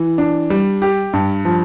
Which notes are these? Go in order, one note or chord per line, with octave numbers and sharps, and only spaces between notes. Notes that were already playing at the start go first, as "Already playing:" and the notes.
Already playing: E3
D4
G3
G4
G2
F3